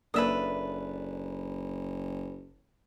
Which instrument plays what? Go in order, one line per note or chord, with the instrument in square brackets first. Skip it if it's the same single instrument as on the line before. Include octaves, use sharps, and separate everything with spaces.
[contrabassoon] F#1 [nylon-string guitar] A#3 D4 A4 [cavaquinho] B4 E5 D#6